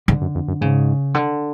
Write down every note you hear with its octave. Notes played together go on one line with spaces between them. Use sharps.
G#2 D3
F#2
F2
F#2
G#2 C#3
D3